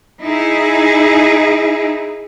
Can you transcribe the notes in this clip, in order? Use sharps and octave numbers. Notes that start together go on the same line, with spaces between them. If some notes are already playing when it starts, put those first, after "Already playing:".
D#4 E4 G#4